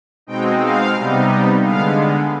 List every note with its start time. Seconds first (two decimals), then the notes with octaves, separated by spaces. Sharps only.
0.27 B2 G#3 C4 D#4 G5
0.60 F5
0.95 C3 G3 B3 D#4
1.62 D3 G#3 B3 F5